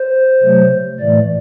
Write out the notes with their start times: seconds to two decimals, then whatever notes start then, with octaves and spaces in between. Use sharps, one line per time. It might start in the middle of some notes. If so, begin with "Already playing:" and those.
Already playing: C5
0.43 C3 F#3 A3
1.00 A2 E3 A3 D5